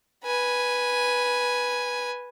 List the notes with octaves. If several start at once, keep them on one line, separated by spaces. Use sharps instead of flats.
B4 G#5